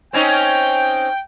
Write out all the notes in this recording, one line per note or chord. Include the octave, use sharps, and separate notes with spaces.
C4 C#4 D#4 G5